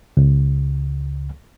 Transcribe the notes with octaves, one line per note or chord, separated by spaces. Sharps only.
C#2